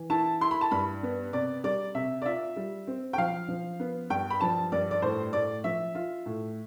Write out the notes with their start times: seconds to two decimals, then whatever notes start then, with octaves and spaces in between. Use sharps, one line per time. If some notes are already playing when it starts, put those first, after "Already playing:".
Already playing: E3
0.10 E4 A5
0.41 E4 C6
0.51 B5
0.61 A5
0.71 G2 B5
1.03 B3
1.33 C3 D5
1.64 G3 D5
1.95 C3 E5
2.22 D5
2.26 F4 E5
2.56 G3
2.87 C4
3.13 G5
3.18 F3 F5
3.48 F3
3.80 B3
4.10 G2 G5
4.30 B5
4.40 F3 A5
4.72 G2 D5
4.91 D5
5.02 A2 C5
5.33 A2 D5
5.64 F3 E5
5.95 F4
6.26 A2